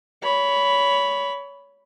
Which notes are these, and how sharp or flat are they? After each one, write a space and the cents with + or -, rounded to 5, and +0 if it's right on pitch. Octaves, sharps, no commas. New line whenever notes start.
C#5 +25 B5 +0